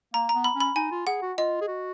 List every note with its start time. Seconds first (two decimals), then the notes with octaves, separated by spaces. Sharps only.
0.14 A#3 A#5
0.29 A#5
0.35 B3
0.44 B5
0.55 C#4
0.60 B5
0.76 D#4 G#5
0.91 F4
1.07 G#4 F#5
1.22 F#4
1.38 F4 D#5
1.61 G#4
1.68 F#4